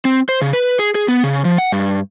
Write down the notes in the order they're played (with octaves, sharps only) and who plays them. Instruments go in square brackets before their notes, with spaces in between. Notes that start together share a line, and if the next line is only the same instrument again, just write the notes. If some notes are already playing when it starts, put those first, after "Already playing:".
[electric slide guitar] C4
C5
C#3
B4
G#4
G#4
B3
C#3
F3
F#5
G2